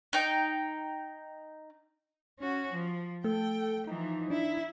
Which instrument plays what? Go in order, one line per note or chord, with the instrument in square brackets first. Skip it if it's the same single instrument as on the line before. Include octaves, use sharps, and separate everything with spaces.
[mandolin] D#4 G5
[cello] C#4 F#4
F3
[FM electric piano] A3 [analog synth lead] A4 [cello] G5
[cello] E3 F3 [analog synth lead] D#4
[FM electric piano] D4 [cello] E4